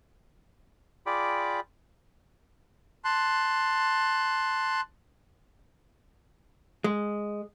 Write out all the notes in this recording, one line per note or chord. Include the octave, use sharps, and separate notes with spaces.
F4 G#4 D5 G5 B5 D6
A5 C6 F#6
G#3